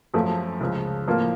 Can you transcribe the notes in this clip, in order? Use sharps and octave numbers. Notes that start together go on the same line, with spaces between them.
F#2 F3 A3
C#2 C#3 F3
A2 F3 A#3 F4 A#4